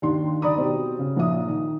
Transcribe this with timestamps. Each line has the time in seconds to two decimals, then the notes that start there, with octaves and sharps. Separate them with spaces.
0.02 D#2 D#3 D4 C6
0.42 D#3 D5 A#5 B5 D#6
0.57 B2 C4 G4
0.99 C#3
1.16 A#1 A#2 D#4 E5 D#6
1.48 D#3